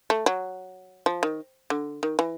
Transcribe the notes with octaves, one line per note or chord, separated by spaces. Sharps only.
A3
F#3
F3
D#3
D3
D#3
E3